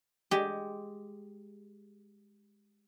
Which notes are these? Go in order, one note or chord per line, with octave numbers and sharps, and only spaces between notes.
G#3 G4